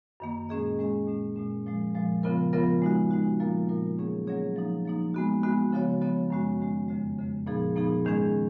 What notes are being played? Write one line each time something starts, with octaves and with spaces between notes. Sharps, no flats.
F#2 D#3 A#3
A#2 G#3 C#4 G#4 D#5
A#2 G#3 C#4 G#4 D#5
A#2 G#3 C#4
A#2 G#3 C#4
A#2 F3 G#3
A#2 F3 G#3
C#3 F3 B3 F4 A#4
C#3 F3 B3 F4 A#4
G#3 D#4 F#4
G#3 D#4 F#4
A#2 F3 A#3 F4 A#4
A#2 F3 A#3 F4 A#4
F#3 A#3 C#4 G#4 C#5
F#3 A#3 C#4 G#4 C#5
F3 A#3 D#4
F3 A#3 D#4
G#3 B3 F#4
G#3 B3 F#4
C#3 F3 B3 F#4 C#5
C#3 F3 B3 F#4 C#5
F#2 D#3 G#3 C#4 F#4
F#2 D#3 G#3 C#4 F#4
F2 C#3 G#3
F2 C#3 G#3
A#2 F3 B3 D#4 G#4
A#2 F3 B3 D#4 G#4
G#2 D#3 G#3 C#4 G#4